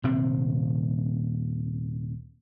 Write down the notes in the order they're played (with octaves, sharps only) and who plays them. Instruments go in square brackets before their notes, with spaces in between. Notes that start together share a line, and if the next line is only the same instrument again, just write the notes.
[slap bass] D#1 C3 C4